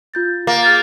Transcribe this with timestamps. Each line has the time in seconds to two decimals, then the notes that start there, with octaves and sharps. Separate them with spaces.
0.14 F4 G6 A6
0.47 A#3 D6 A6
0.63 G#4 F6 G6 A6